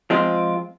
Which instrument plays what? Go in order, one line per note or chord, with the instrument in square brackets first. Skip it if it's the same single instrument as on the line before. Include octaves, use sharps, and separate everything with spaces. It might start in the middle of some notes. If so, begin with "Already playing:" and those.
[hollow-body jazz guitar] F3 G#3 C4 F4